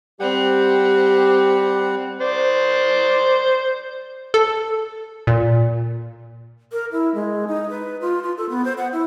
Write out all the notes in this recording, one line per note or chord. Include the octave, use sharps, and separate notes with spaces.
G3 C4 G4 F#5
C5 D5
A4
A#2
A#4
E4
G#3
D#4
B4
F4
F4
A4
B3
C5
F#5
E4